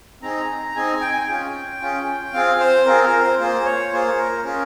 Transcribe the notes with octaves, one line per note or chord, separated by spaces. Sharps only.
C4 D#4 G#4 A#5
C4 D#4 G#4 G#5
G5
G#5
G5
C#4 F4 G#4
C#4 F4 G#4
C4 F4 G#4 F5
C5
C4 F4 G#4 A#4
A#4
C5
A#3 F4 G#4 C5
C#5
A#3 F4 G#4 C5
A#4
C#4 F4 G#4 A#4